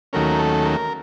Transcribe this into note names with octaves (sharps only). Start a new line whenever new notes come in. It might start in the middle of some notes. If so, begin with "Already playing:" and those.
D#2 D#3 F#3 A3 C#4 A#4
A4
A#4